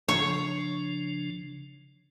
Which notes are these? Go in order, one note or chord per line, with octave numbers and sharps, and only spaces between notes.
C#3 F3 D4 C#5